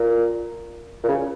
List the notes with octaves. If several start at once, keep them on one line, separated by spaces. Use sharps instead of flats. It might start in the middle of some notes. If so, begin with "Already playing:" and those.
Already playing: A#2
A#2
C#3